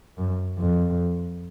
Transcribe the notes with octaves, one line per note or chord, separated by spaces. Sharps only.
F#2
F2